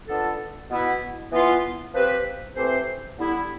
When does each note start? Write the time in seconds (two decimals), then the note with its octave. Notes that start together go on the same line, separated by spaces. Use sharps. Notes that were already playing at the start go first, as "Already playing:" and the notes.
0.08 B3 D4 F4 A4
0.70 B2 B3 E4
1.32 E3 B3 F4
1.94 F3 C4 G4 B4
2.56 E3 A3 C4 G4 C5
3.18 D3 G3 B3 E4